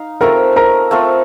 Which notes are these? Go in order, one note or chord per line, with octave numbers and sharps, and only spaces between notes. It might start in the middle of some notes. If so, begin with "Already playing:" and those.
Already playing: D#4 F5
A3 C4 F4 A4 A#4 A#5
A#4 A#5
A3 C4 F4 A4